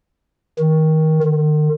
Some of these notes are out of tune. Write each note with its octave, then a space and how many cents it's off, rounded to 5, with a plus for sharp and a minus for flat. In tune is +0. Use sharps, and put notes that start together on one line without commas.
D#3 +20
D#3 -40